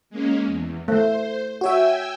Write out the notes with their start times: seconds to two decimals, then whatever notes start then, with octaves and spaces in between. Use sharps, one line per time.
0.10 G#3 A#3 C#4
0.47 E2
0.88 A3 C5
1.61 F#4 C#5 E5 G5 G#5 E6